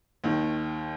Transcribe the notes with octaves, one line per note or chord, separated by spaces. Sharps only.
D#2 D#3